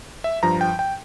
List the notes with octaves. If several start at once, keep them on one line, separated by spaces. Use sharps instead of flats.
E5
G2 F3 A#5
G5
G5